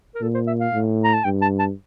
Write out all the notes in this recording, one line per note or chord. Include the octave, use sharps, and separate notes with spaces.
A#4
A#2 A4
C5
E5
F5
A2
A#5
A5
G2 G5
A5
A5